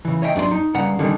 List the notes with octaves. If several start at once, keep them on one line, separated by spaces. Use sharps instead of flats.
C#3 E3
C#5 D#5 E5 G5
F#2 D4 G4 C6
D#4
G2 C#3 F#5 A#5
D3 D#3 G3 C#4 A4